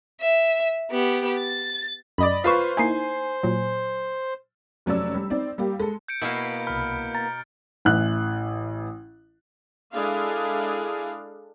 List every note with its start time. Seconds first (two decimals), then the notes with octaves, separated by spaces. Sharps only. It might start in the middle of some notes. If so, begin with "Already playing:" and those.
0.21 E5
0.91 B3 G4
1.39 A6
2.18 F#2 D5 D#5 B5
2.44 F4 B4 C5 C#6 B6 C7 E7
2.77 A#3 D#4 E4 G#5 C7
3.43 A#2 F#3
4.86 F1 F#3 C#4 D5 E6
5.14 G3
5.30 C4 D#4 D5
5.58 G3 A#3 G4
5.80 G#3 A4
6.08 G6 C#7 D7
6.22 B2 A#3 B3 E4 E5 F5
6.67 C2 B5 F6
7.15 A#5 A6
7.85 A1 E3 F#6
9.93 G#3 D4 E4 G#4 A4 F5